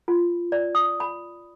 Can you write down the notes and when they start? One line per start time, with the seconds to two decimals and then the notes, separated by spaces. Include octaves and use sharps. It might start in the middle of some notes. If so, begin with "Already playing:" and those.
0.08 F4
0.52 D5
0.75 D#6
1.00 B5